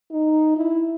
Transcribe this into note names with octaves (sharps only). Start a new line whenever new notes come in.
D#4
E4